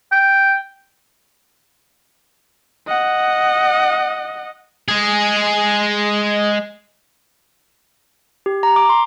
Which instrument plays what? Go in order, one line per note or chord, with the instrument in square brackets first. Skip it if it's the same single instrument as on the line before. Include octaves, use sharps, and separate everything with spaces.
[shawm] G5
[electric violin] D#5 F#5
[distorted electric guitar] G#3 G#4
[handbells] G4
A#5
D6
C6